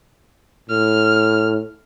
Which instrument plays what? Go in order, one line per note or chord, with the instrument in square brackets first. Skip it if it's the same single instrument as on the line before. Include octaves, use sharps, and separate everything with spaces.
[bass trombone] A2 [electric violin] F6